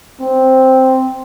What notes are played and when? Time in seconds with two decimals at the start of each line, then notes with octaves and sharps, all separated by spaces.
0.20 C4